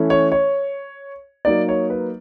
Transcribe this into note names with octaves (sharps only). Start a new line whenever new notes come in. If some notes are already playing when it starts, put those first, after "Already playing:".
Already playing: E3 A3 C#4 E4
C#5
C#5
F#3 A#3 D#4 D5
C#5
B4